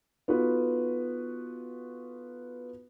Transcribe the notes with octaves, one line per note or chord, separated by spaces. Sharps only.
B3 D#4 F4 F#4 A4 B4